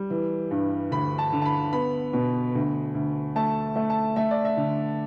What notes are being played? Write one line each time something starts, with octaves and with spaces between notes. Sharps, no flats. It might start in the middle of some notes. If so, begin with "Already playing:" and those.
Already playing: G3
E3
G2
D2 B5
A5
D3
A5
B5
B3 B5
B2
D2
D2
A3 A5
A3
A5
A3 E5
D5
E5
D3